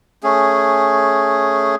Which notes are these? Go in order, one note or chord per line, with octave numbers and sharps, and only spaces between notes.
A3 C#4 G#4